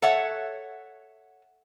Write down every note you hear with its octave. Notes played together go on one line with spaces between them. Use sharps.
A4 C#5 E5 F#5